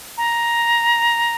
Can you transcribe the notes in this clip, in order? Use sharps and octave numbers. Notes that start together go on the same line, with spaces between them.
A#5